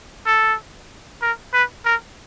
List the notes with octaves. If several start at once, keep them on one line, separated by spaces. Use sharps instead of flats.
A4
A#4
B4
A#4